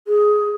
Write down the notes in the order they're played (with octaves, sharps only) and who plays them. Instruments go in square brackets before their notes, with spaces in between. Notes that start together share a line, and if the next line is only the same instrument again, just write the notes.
[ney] G#4